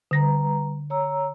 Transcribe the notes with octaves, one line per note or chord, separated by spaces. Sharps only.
D3 G3 B4 A#5 A#6
C#5 A#5 E6